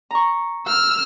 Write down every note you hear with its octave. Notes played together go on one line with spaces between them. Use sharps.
A#5 C#6
E6 F6